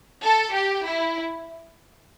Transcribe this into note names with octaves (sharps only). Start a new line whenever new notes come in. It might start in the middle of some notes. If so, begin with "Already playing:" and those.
A4
G4
E4